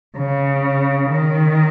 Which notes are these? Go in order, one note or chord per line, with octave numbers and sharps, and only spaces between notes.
C#3
D#3